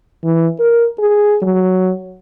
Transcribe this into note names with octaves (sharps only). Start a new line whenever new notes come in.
E3
A#4
G#4
F#3